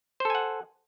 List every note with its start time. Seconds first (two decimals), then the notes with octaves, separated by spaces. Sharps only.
0.20 C5
0.25 A4
0.30 G#5
0.35 F#5